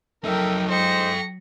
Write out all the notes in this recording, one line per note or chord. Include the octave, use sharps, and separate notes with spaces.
F2 F#3 D#4 A4 A#4 E5 G5
G#3 D#4 A4 C5 G5 A#6 C#7